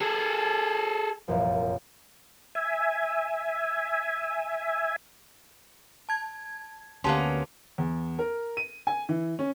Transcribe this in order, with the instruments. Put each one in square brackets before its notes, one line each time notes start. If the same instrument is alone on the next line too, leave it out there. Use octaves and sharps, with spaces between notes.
[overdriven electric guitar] G#4 A4
[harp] F1 A#1 F#2
[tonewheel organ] E5 G#5
[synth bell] A5 G#6
[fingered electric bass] D2 D3 [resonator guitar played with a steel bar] A#3 B3 C#4 [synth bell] G4 A5 C6
[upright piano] E2
A#4
D#7
G#5
E3
C#4